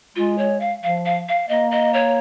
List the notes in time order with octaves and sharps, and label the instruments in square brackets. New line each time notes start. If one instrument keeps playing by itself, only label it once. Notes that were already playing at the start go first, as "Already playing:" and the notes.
[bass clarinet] G#3 [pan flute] F4
[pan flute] C#5
F5
[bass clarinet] F3 [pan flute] F5
[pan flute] F5
F5
[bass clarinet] A#3 [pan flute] D#5
[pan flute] D#5
C#5